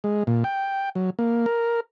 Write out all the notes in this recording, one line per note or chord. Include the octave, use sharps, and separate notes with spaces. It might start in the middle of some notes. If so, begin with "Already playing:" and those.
G#3
A#2
G5
F#3
A#3
A#4